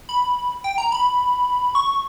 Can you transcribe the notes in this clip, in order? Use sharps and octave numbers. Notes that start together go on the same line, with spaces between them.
B5
G5
A#5
B5
C#6